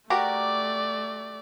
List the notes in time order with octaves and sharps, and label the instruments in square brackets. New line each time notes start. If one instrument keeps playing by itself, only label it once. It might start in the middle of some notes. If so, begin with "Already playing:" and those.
[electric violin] A3 D5 [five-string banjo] F#4 G4 A#4